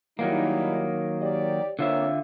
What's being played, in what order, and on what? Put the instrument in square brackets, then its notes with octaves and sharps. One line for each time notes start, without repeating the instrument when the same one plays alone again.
[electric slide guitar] D#3 F#3 A#3 [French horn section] G3 D#4 E4
[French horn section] G4 C#5 D5
[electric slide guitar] D3 F4 E5 [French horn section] A#3 C4 C#5